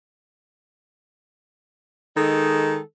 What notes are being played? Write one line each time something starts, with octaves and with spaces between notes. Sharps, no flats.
D#3 G#3 D#4 A4